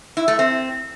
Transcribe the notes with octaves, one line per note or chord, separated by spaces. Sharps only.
E4
A3
C4